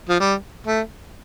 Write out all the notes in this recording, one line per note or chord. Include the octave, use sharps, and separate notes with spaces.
F3
G3
A3